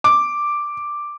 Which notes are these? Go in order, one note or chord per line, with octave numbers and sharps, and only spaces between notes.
D6